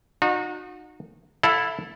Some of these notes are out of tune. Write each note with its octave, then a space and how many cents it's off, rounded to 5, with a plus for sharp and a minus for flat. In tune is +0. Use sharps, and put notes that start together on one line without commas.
D#4 -25 F#4 -30
E4 +0 A4 +0 F5 +40